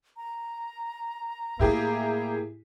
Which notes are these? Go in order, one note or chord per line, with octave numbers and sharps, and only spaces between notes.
A#5
A2 A#3 E4 G4 G#4